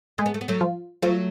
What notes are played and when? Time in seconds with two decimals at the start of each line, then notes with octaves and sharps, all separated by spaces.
0.18 G#3 A3 G#4
0.26 B3
0.34 A3
0.41 B3
0.48 F#3 A3
0.61 F3 F4
1.02 F3 F#3 A3 F4